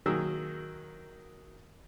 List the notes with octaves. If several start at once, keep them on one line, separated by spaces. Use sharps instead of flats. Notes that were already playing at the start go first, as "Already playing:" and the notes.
D#3 F#3 A#3 G#4 E6